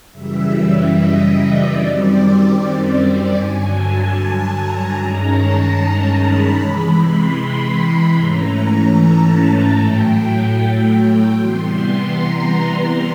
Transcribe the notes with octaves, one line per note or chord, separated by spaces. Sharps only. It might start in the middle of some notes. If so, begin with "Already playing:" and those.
F#2 C#3 E3 G3 E5
D#5
D5
F#2 D#3 G3 C4
D5
G2 D3 F#3 G#5
A5
A#5
G2 D#3 G#3 C#4
A5
A#5
B5
C3 E3 G#3
C6
B5
C6
G#2 E3 A3 C#4 A#5
A5
A2 F#3 A3 G5
C3 E3 G3 B3 C6
A#5